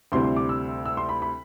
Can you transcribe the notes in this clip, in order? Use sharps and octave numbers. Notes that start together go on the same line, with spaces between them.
D2 C3 G3 C4 E4 C6
C6
D6
E6
E6
C6
B5
B5